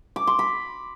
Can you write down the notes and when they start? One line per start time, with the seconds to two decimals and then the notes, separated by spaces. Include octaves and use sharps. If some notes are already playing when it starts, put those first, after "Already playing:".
0.16 D6
0.27 C6
0.39 B5